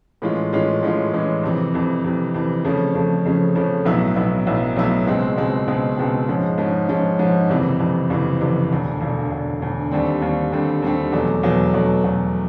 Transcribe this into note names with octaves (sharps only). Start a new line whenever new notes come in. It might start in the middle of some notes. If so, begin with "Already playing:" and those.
A2 E3 G#3 C#4 F4
A2 E3 G#3 C#4 F4
A2 E3 G#3 C#4 F4
A2 E3 G#3 C#4 F4
F2 C3 E3
F2 C3 E3
F2 C3 E3
F2 C3 E3
F2 C#3 F3 A3 C#4
F2 C#3 F3 A3 C#4
F2 C#3 F3 A3 C#4
F2 C#3 F3 A3 C#4
B1 A2 F#3 B3 E4
B1 A2 F#3 B3 E4
B1 A2 F#3 B3 E4
B1 A2 F#3 B3 E4
C#2 B2 G#3 C4
C#2 B2 G#3 C4
C#2 B2 G#3 C4
C#2 B2 G#3 C4
G#2 F3 G#3 C#4
G#2 F3 G#3 C#4
G#2 F3 G#3 C#4
G#2 F3 G#3 C#4
F#1 F2 C3 E3
F#1 F2 C3 E3
F#1 F2 C3 E3
F#1 F2 C3 E3
E1 D2 D3
E1 D2 D3
E1 D2 D3
E1 D2 D3
D#2 D3 G3 C4
D#2 D3 G3 C4
D#2 D3 G3 C4
D#2 D3 G3 C4
E2 B2 F#3 A3
E2 B2 F#3 A3
E2 B2 F#3 A3
E2 B2 F#3 A3